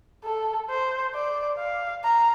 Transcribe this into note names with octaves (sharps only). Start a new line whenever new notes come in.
A4
C5
D5
F5
A#5